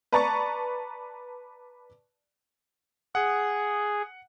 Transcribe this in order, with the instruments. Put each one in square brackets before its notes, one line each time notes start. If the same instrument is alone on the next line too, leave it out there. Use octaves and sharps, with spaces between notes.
[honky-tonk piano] B4 D5 A5 A#5 C#6 A6
[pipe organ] G#4 [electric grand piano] F#5